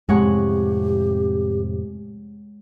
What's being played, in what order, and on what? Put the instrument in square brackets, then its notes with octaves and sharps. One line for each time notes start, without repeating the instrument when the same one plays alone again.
[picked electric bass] F2 A2 C3 [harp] G#3 C#5 F#5 [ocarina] G4